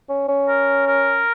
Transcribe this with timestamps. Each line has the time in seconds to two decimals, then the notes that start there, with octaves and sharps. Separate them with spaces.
0.09 C#4
0.28 C#4
0.48 A#4
0.87 A#4